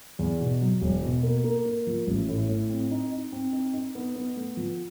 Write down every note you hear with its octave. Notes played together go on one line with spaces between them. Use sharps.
E2
B2
F#3
E1
B2
A#3
A#3
A#3
F3
A1
A2
A2
C4
D#4
D#4
C4
D#4
D#4
B3
B3
A3
F3